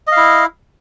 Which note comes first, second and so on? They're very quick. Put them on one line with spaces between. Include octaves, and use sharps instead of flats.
D#5 F5 E4